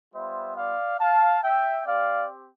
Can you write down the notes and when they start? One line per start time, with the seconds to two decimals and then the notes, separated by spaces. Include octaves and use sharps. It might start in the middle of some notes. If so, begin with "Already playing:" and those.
0.13 G3 B3 F4 C5 E5
0.56 D5 F5
1.00 F5 A5
1.43 E5 G5
1.86 C4 G4 D5 F5